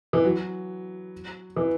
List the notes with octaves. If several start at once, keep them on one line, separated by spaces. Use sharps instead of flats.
E3
F#3
E3